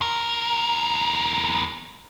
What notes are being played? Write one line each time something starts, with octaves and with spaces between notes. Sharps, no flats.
E2 A#4